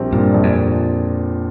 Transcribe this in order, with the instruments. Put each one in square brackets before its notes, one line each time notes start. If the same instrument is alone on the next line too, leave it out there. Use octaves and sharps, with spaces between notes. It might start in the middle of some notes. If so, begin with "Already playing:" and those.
Already playing: [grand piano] A#1 G3 C4
[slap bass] G2 [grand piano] A#2
[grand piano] A#1
[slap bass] F2
[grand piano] A#1